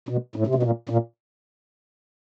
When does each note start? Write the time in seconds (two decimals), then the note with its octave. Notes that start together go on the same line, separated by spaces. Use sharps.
0.09 B2
0.36 A2
0.47 C3
0.55 B2
0.63 A#2
0.89 A#2